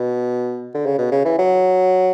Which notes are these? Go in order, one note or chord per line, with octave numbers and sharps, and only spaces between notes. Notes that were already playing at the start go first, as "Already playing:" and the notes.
Already playing: B2
D3
C#3
B2
C#3
E3
F#3